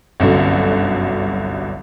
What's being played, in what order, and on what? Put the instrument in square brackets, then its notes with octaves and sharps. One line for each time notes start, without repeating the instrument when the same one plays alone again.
[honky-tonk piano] G1 C2 F#2 D3 F#4